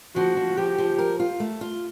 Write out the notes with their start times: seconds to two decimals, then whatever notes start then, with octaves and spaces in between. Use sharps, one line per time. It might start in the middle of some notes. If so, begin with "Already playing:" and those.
0.16 F3 F#4
0.37 F3
0.57 F3 G4
0.78 F3
0.98 A#4
1.20 F4
1.40 A3
1.61 F4